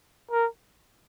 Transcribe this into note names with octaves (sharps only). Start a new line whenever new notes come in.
A#4